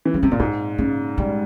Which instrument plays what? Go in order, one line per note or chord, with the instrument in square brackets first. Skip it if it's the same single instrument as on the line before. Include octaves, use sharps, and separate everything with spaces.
[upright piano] E3
[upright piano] C#3 [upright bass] G3
[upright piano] C3 [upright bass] G#3
[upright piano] A#2 [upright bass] A#3
[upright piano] G#2 [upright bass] C4
[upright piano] C#3 [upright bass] A#3
[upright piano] G3 [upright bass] G#3